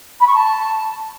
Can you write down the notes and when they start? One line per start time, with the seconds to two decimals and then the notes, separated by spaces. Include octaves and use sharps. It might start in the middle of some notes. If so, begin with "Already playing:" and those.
0.20 B5
0.27 C#6
0.34 A5